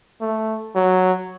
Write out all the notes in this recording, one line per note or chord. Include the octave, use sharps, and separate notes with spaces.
A3
F#3